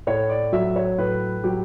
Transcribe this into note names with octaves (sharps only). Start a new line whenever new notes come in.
A2 C#5
D5
F#3 E5
C#5
A2 B4
F#3 G4